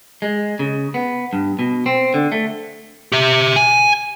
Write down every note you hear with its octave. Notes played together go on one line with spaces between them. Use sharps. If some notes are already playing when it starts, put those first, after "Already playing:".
G#3
C#3
B3
G2
B2
C4
D3
A3
G4 E5
G#5